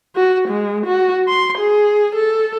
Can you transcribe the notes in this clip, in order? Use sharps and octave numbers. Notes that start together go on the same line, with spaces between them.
F#4
G#3
F#4
C6
G#4
A4